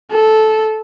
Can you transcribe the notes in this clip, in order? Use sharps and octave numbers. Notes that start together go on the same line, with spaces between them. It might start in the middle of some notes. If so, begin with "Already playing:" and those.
A4